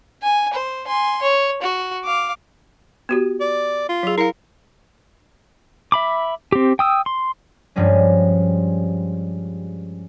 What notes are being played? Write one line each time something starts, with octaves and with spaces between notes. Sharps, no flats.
G#5
C5
G#5 C6
C#5
F#4
F5 D6
B3 F#4 G4
D5
F4
F#3 G#4
E4 A#4 F5
E5 B5 D6
C4 G4
G5 D#6 E6
C6
G2 F3 G3 G#3 C#4